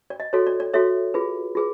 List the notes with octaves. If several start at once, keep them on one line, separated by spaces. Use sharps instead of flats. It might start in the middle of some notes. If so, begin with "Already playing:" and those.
D5
D#5
F#4 A4 C#5
D5
D5
F#4 A4 C#5 E5
F4 G#4 B4
F4 G#4 B4